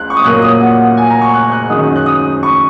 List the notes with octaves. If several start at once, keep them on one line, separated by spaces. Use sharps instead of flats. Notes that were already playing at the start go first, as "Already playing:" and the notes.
Already playing: C#2 F#6
C#6
D#6
A#2 F#3 A#3 F#6
D#6
F#5
G#5
A#5
C#6
F#6
F#6
F#2 D#3 G#3 D#4 D#6
F#6
D#6
C#6